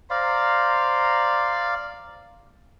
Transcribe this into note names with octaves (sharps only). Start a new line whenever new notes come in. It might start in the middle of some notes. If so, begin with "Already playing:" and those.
C5 D5 F5 A#5